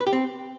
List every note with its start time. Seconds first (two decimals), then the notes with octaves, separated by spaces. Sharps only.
0.01 B4
0.07 G4
0.13 C4